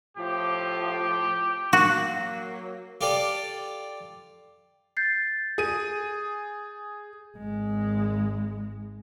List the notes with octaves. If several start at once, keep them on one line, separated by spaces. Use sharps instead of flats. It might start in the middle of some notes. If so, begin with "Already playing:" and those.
A2 F3 G4
F#3 A#3 F#4
F4 G4 A4 D5
G6 A6 C7
G#4 D#7
G#1 G#3